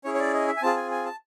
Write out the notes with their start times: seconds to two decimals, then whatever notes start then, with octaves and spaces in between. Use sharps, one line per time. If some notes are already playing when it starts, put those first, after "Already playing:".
0.04 C#4 E4 G#4 C#5
0.15 C#5
0.19 D5
0.34 D#5
0.48 E5
0.57 G#5
0.62 C4 F4 G#4 A5
0.77 G#5
0.91 G#5
1.05 A5